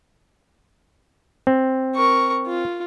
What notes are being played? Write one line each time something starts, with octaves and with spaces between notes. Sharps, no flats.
C4
A#4 C#6
F4